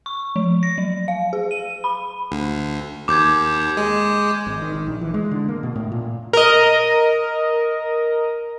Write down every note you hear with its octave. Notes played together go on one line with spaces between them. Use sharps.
C#6
F3
A#6
F#3
F5
G#4
D#7
B5
D2
D#2 D6 G6 G#6
G#3
G#1
D#3
D#3
A#1
E3
G#3
D3
A#3
B2
A2
A#2
A#4 D#5